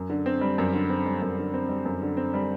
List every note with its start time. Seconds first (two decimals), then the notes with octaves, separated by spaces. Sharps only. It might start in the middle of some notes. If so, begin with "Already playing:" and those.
Already playing: F#2
0.10 D3
0.26 C4
0.41 G3
0.58 F#2
0.73 D3
0.90 C4
1.06 G3
1.22 F#2
1.38 D3
1.54 C4
1.69 G3
1.85 F#2
2.02 D3
2.17 C4
2.34 G3